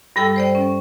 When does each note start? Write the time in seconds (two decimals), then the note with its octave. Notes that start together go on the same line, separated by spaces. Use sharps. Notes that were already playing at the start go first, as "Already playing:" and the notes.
0.16 G2 G3 A4 G5 E6
0.36 C5 D5 G5
0.55 C#4